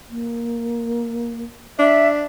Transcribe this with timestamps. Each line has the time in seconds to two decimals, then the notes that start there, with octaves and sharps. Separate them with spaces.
0.10 A#3
1.79 D4 E5